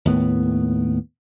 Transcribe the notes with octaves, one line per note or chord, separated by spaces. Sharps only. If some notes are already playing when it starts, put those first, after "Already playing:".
D#2 A2 B3